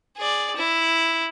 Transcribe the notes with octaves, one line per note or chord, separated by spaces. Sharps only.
G#4 D5
E4